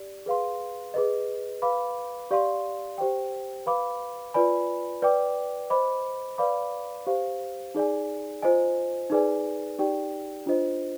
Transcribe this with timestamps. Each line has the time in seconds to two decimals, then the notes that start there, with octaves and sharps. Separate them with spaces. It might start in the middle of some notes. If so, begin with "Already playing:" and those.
Already playing: G4 D5
0.26 G#4 B4 F5 C6
0.94 G#4 B4 D#5
1.62 B4 F5 B5 D6
2.31 G4 D5 F5 C6
2.98 G4 C5 G5
3.66 B4 F5 B5 D6
4.34 F4 B4 D5 G#5 B5
5.02 B4 D5 G5 D6
5.70 C5 D#5 B5 D6
6.38 B4 D5 F5 B5 D6
7.07 G4 C5 F5
7.75 D#4 G#4 D5 G#5
8.42 F4 C5 D#5 G#5
9.10 D#4 G#4 B4 D5 G#5
9.79 D#4 G4 D5 G5
10.46 D4 F4 C5 D#5